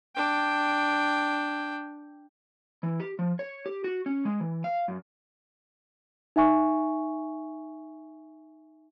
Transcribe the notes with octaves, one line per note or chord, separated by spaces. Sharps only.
D4 G5
E3
G4
F3
C#5
G4
F#4
C#4
G#3
E3
F5
F#2
D#4 E5 G#5 C#6